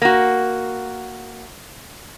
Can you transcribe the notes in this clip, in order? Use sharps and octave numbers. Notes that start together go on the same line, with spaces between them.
A#3 F#4